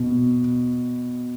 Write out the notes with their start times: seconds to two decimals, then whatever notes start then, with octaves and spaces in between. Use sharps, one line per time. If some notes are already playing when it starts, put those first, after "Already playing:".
Already playing: B2